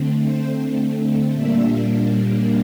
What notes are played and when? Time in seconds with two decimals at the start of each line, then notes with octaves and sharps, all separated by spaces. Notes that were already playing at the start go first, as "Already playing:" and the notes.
Already playing: D3 A3 C4
0.20 C5
1.34 A#2 G3 A#3 D4 E5